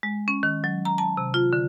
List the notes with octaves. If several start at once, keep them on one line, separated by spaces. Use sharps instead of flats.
G#3
C#4
D#3
F#3
A#5
A5
C3
F4
D3